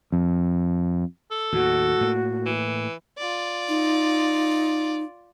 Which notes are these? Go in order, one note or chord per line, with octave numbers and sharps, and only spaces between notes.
F2
A4
D#2 A2 D#3 F#4
A2 A#3
E3
F4 D5
D#4